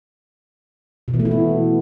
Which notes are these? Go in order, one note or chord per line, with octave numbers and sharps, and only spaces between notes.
B2
E3
A3
E4
B3